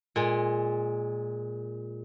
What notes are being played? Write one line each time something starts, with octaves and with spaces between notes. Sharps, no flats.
A#2 G#3